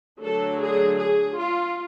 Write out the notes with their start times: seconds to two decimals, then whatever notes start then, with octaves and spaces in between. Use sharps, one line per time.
0.21 D3 F#3 A3 D4 A4
0.59 G#4
0.98 G#4
1.37 F4